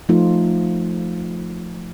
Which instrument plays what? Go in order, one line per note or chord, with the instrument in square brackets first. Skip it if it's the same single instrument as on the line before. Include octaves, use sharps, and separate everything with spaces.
[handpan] F3 A3 D#4 F4